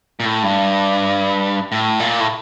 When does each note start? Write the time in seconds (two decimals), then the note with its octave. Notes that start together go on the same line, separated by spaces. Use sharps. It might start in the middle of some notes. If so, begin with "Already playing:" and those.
0.20 A#2
0.25 A2
0.43 G2
1.72 A2
2.00 A#2
2.20 A2